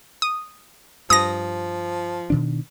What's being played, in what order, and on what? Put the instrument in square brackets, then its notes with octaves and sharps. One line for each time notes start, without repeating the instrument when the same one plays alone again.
[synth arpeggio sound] D#6
[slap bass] G2 [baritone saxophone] F3 [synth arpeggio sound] D#6 A#6
[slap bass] B2 D#3 D4